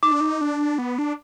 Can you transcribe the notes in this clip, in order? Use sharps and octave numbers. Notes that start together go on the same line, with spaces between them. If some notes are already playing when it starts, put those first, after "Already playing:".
D#4 D6
D4
D#4
D4
B3
D4